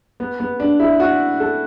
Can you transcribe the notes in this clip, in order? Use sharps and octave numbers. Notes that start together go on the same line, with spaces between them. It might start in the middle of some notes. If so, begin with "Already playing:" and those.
B3
B3
D4
E4
F#4
A4